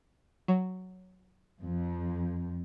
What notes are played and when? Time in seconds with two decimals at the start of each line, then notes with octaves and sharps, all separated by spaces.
0.48 F#3
1.63 F2